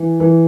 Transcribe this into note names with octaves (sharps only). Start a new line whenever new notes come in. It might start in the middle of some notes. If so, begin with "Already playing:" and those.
Already playing: E3
E3